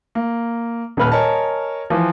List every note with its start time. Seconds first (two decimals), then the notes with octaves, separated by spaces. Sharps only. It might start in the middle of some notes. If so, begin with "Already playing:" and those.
0.15 A#3
0.97 D#1 D#2 B4 F6
1.12 A#4 C#5 D#5 G#5 A5
1.90 E3 F3